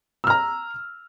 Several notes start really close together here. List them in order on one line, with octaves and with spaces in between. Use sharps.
E6 F6 A#5